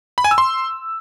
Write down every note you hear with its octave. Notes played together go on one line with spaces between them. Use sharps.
B5
G#5
E6
C6